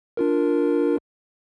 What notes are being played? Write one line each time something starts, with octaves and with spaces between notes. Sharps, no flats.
D4 F4 A#4